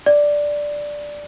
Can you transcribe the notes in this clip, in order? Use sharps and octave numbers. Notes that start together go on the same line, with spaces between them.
D5